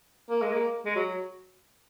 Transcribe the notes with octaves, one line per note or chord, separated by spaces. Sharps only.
A#3
G#3
A#3
G#3
F#3